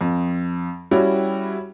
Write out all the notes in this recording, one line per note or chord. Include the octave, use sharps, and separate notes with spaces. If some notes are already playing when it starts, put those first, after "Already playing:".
F2
G3 C#4 E4 F#4 G4